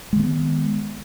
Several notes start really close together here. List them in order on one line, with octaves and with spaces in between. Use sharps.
G#3 D#3 A#3 B3